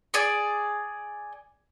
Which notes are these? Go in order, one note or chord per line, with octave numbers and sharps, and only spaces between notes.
G#4 D5